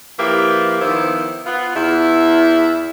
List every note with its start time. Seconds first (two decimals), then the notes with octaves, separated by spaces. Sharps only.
0.19 F3 A#3 E4 G4 B4
0.81 D#3 F3 B3 E4 C5
1.46 B3 F4
1.76 E2 E4